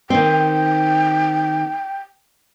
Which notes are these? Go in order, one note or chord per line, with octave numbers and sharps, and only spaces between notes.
D#3 C4 G5